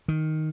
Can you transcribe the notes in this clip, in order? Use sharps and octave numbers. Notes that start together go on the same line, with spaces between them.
D#3